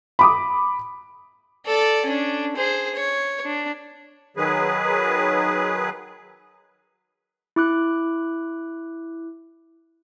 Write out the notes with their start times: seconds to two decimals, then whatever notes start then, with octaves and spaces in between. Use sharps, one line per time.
0.19 B5 D6 D#6
1.66 A4 D5
2.06 C#4 D4
2.56 G#4 C5
2.95 C#5
3.44 D4
4.37 D#3 F#3 G#4 B4
7.56 E4 D6 F#6